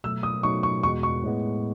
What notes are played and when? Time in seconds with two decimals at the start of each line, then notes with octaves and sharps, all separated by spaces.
0.04 B2 F#3 A3 E6
0.23 D#6
0.43 B2 F#3 A3 D#4 C#6
0.63 C#6
0.83 E2 B2 G#3 C#6
1.03 C#6
1.23 A2 G#3 B3